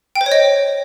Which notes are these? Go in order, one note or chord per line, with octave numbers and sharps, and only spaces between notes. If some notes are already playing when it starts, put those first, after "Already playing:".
G5
C5
C#5
D#5